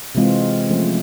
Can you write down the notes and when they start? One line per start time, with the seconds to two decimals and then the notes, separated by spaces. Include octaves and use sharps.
0.15 C3 E3 G#3 C4 F4
0.70 F3 A3 C#4